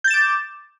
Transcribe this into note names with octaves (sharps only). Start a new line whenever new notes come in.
D6 G6 A6 E7